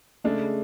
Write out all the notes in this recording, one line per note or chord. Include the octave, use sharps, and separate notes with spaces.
C#3 G#3 A3 D4